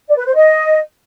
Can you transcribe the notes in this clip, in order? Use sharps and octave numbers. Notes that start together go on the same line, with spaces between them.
D5
B4
C5
D#5